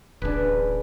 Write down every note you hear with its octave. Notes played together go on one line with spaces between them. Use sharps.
D1 A1 D4 G#4 B4